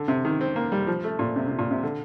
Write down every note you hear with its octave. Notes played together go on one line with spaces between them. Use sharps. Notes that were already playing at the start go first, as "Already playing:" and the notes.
Already playing: D3
C3
D#3
C4
A#3
G3
F3
A3
A#2
C3
C3
A#2
C3
D3